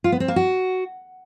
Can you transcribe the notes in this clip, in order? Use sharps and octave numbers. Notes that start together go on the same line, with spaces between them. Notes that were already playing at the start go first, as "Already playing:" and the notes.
F4
B3
C4
A#3
F#4